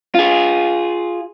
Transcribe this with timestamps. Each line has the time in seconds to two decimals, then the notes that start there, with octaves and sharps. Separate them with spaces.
0.15 F4 G#4